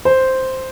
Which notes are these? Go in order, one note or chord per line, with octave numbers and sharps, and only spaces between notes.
C5